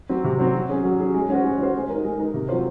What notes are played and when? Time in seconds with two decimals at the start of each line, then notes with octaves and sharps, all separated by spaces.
0.09 F#3 C4
0.24 C3
0.39 F#3 C4
0.54 F#3
0.69 C#4 G#4
0.84 F#3
1.00 C#4 G#4
1.14 G#3
1.30 C#4 F#4 C5
1.44 G#3
1.60 C#4 F#4 C5
1.75 G#3
1.90 D#4 A#4
2.05 G#3
2.19 D#4 A#4
2.34 C3
2.49 F#3 C4 F4 C5